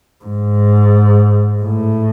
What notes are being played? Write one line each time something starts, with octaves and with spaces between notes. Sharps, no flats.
G#2
A2